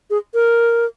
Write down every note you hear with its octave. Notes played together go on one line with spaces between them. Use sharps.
G#4
A#4